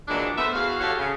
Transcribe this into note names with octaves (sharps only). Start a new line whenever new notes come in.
A#2 E3 F#3 G#3 D4
A3 B3 C5 E5
E2 F#4 F5
F#4 G4 A4 C#5 F5 F#5
C#3